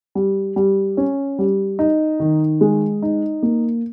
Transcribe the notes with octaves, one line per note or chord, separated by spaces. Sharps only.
G3
G3
C#4
G3
D#4
D#3
G#3
D#4
A#3